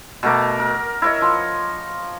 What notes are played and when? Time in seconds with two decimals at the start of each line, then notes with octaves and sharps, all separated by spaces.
0.23 B2 A3 A#4 D6
0.60 A#4
1.02 E4 C#5 D#5
1.22 F3